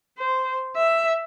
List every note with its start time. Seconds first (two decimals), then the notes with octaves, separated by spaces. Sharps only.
0.18 C5
0.76 E5